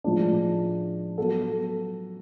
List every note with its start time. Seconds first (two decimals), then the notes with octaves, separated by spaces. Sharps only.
0.04 A2 F3 G#3 D4
1.18 F#3 B3 F#4 A4